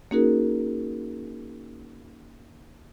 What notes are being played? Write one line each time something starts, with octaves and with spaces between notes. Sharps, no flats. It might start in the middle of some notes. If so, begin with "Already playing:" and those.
A#3 C#4 D#4 F#4 G#4 A#4